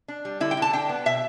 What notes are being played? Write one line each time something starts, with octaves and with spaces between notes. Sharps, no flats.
D4
G3
D3 E4
G5
D3
A5
D4 G5
B3
B2 E5